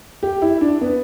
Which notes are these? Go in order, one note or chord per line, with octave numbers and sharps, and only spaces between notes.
G4
E4
D4
B3